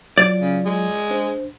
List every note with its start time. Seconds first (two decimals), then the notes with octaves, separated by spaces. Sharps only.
0.18 F#3 F4 D5
0.41 C#3
0.65 G#3
1.10 D4 C5